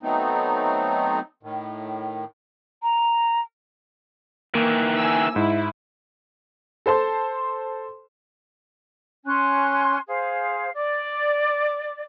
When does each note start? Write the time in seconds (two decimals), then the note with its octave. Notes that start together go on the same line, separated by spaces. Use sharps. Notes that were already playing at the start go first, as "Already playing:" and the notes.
0.03 F#3 A3 B3 C4 D#4
1.43 A2 D#3
2.83 A#5
4.55 D#3 E3 A#3
4.97 G#5 E6
5.36 G#2 E4
6.86 A4 C5 A5 C6
9.25 C#4 G#5 C6 F#6
10.08 G#4 C5 F5
10.74 D5 D6